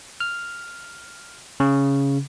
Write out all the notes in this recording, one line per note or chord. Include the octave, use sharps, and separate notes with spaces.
F6
C#3